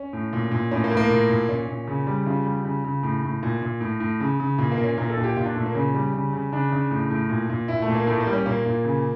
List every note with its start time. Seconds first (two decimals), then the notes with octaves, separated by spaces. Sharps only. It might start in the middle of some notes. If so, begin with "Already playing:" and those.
Already playing: C#4
0.13 A2
0.33 A#2
0.51 A#2
0.71 A2 C#4
0.84 A#3
0.91 A2
0.97 A#3
1.10 A#2
1.29 A#2
1.49 A#2 C#4
1.68 A#2
1.87 C#3
2.07 G3
2.26 C#3 F4
2.45 G3
2.65 C#3
2.84 C#3
3.03 A2
3.23 A2
3.43 A#2
3.62 A#2
3.81 A2
4.00 A2
4.20 C#3
4.40 C#3
4.58 A#2
4.72 A#3
4.78 A#2
4.84 C#4
4.97 A#2 A#4
5.10 A4
5.17 A#2
5.23 G4
5.36 A#2 F4
5.46 D4
5.55 A#2 A3
5.66 A#3
5.75 C#3 C#4
5.94 G3
6.14 C#3
6.33 C#3
6.52 C#3 D4
6.72 C#3
6.91 A2
7.11 A2
7.29 A#2
7.50 A#2
7.68 A#2 E4
7.82 A3
7.88 A#2
7.95 A#3
8.07 A2 A3
8.20 A#3
8.27 G3
8.33 C#4
8.46 A#2 A#3
8.66 A#2
8.85 C#3